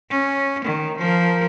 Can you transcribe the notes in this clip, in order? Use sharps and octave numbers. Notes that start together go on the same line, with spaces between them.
C#4
D#3
F3 A#4